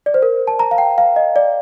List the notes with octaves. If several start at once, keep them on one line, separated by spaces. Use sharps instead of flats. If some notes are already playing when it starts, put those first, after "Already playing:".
D5
C5
A#4
A5
A#5
F5
G5
F5
D#5
D5